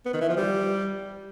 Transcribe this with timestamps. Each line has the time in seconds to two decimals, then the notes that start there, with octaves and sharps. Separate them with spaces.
0.06 B3
0.13 D#3
0.21 E3
0.29 F3
0.37 G3